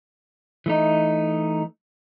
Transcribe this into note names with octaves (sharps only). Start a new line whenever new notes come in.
E3 A3 D#4